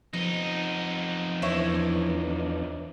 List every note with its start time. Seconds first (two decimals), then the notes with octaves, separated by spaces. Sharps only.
0.13 F2 F3 B3 D#4
1.42 E2 E3 D4 E4 C5 C#5